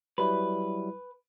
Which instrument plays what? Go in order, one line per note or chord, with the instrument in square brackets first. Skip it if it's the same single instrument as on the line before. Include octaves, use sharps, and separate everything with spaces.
[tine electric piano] F#3 G3 E4 [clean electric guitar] B4